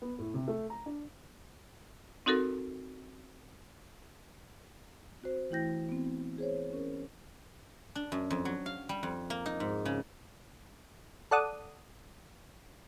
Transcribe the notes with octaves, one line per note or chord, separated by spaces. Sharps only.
B3
A2
C3
A3
A#5
D4
C4 D#4 F#4 A4 A#4
C4 F#4 C5
E3 A3 E4 G5 G6 A#6
B3 C4
G#4 C5 C#5
C#4 A#4
D4
F#2
F2
F#3
F5
G3
F2
A#3
D#4
G#2
C#3
A4 D5 F#5 D#6